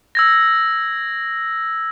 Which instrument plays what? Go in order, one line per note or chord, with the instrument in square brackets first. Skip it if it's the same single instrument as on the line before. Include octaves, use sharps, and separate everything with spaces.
[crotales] E6 G#6 A#6